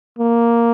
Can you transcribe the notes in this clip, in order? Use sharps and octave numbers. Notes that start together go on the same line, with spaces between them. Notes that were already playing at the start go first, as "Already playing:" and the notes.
A#3